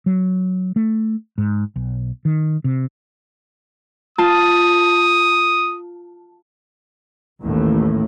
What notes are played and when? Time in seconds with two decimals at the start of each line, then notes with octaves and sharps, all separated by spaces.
0.06 F#3
0.76 A3
1.38 G#2
1.76 B1
2.25 D#3
2.64 C3
4.18 F4 A5 D#6
7.42 A1 D#2 A2